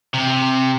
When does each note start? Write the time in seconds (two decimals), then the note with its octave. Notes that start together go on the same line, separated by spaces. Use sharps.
0.14 C3